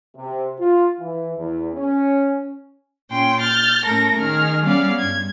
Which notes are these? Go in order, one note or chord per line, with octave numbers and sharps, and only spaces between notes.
C3
F4
E3
E2
C#4
A#2 C#4 G5 C6
F6 G6 A6
A2 A3 C#4 A4 A#4 A#6
D#3 G#4 F6
G3 B3 C#4 G#4 D5 F5
G2 G#6